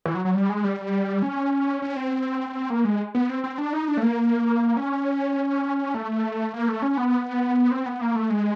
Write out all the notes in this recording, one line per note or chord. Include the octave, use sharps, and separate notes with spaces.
E3
F#3
F#3
G3
G#3
G3
C#4
C#4
C4
A#3
G#3
B3
C4
C4
D4
D#4
D4
A3
A#3
C#4
A3
A#3
A3
C#4
B3
C4
B3
A#3
A3
G#3